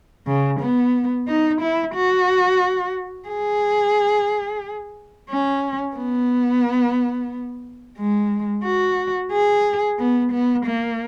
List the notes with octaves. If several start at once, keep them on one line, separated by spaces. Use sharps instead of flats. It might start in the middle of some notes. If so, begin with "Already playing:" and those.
C#3
B3
D#4
E4
F#4
G#4
C#4
B3
G#3
F#4
G#4
B3
B3
A#3